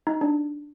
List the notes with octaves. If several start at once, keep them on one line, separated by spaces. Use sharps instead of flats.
D#4
D4